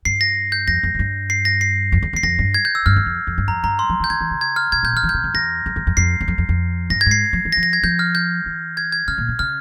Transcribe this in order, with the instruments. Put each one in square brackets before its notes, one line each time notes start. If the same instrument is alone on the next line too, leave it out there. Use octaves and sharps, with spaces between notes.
[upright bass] G2 [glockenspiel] C7
[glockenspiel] A#6
G6
[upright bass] F2 [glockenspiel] A#6
[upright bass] F2
F2
G2
[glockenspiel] C7
A#6
C7
[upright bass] F2
E2
[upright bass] E2 [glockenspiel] C7
[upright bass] F2 [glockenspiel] A#6
[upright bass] G2
[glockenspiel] G#6
G6
E6
[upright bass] G2 [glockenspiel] F6
[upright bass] E2
F2
F2
G2
[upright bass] F2 [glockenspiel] A#5
[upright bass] G2 [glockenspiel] A#5
[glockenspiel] C6
[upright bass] F3
E3
[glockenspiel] G6
[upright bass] E3 [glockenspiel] G#6
[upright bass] E3
C#3
[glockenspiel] G#6
F6
[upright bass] C3 [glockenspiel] G#6
[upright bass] A#2 [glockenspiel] G6
[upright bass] E3
[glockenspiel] F6
[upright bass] E3
[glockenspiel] G6
[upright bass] C3
F2
[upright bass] E2 [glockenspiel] A#6
[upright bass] F2
E2
F2
[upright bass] F2 [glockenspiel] C7
[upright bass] E2
F2
F2
F2
[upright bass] G2 [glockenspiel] A#6
[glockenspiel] G#6
[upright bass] G#2
[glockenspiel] C7
[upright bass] F3
E3
[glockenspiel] A#6
[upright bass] F3
[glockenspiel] A#6
G#6
[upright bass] F3 [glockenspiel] G6
[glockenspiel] F6
G6
[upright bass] E3
[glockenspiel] G#6
G#6
[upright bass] C#3 [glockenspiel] F6
[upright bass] A#2
C#3
[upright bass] C#3 [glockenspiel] F6